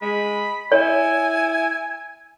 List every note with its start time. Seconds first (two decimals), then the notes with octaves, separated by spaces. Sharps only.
0.02 G#3 B5
0.72 E4 C#5 G#5